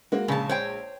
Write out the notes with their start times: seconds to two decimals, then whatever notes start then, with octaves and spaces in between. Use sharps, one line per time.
0.12 G#3 A#3 F#4
0.28 A#1 C#3 G#3 G#5 A5
0.49 C5 C#5 G5